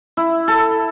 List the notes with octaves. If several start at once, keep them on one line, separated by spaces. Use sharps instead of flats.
E4
A4